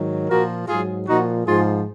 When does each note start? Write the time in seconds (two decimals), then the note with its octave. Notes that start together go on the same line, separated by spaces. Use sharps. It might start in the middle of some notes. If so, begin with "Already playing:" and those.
Already playing: G#2 D#3 F#3
0.29 A#2 F3 F#4 A#4
0.67 G#2 F#3 F4 G#4
1.06 A#2 F3 D#4 F#4
1.46 G#2 F3 F4 G#4